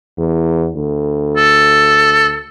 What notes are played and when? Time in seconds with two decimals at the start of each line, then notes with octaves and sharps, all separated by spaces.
0.18 E2
0.75 D2
1.37 A4